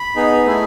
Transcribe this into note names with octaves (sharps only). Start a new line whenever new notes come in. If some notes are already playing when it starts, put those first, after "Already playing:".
Already playing: B5
B3 D#4 G#4
A3 E4 G#4